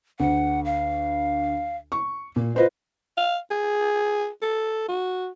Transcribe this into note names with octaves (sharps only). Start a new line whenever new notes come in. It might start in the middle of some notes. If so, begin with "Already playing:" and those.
D2 F#5
F5
C#6
A#2 A#3
F4 B4 C5 D#5
F5
G#4
A4
F#4